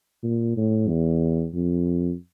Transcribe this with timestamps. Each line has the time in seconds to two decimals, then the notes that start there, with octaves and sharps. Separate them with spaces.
0.24 A#2
0.57 A2
0.89 E2
1.54 F2